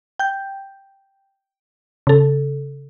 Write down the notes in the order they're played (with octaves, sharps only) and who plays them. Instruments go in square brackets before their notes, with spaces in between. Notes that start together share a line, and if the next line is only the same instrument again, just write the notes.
[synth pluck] G5 G6
C#3 A4